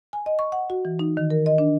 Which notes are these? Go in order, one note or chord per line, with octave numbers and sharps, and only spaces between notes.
G#5
D#5
C#6
F#5
F#4
E3
D#4
D#3
A#4
D#5
D4